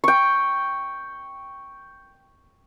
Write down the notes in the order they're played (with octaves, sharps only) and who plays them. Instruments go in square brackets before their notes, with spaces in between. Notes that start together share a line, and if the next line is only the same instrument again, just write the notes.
[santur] G5 C#6